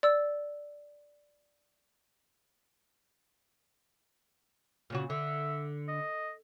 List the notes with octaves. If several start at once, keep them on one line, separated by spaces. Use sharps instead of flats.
D5 E6
A#2 C#3 F#4
D3 E5
D#5